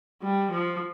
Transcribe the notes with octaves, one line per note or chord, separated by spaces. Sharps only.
G3
F3